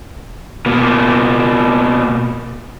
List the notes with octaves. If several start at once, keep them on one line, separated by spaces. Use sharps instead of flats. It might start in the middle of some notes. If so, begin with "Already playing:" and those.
B2 A#3